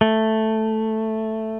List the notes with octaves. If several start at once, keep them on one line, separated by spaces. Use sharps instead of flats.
A3